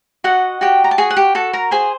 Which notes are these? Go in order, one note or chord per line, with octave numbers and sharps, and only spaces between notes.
F#4 D#5 F#5
F#4 G4 G5
A#5
A5
F#4 G#4 G#5
F#5
G4 G5
F#4 A4 A5
A#4 A#5
G#4 C5 G#5